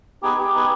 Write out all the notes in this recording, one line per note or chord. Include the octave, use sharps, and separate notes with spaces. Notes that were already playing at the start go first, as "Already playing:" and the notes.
B3 D#4 G4 G#4 B4
G4
B3 D#4 G#4 B4